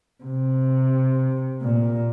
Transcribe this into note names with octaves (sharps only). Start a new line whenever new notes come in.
C3
A#2